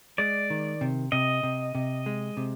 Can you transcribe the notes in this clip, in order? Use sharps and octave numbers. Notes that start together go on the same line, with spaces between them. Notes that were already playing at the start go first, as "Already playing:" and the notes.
G#3 D5
D#3
C3
C3 D#5
C3
C3
G#3
C3